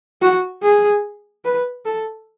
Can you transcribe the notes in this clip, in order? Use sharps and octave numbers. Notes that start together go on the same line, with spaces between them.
F#4
G#4
B4
A4